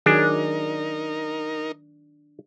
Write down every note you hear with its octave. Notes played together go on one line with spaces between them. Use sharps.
D#3 F#3 D4 D#4 G#4 A#4